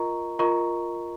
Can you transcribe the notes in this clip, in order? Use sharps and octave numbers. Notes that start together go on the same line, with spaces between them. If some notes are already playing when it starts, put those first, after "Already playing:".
Already playing: F4 A#4 D#5 A#5 C#6
F4 A#4 D#5 A#5 C#6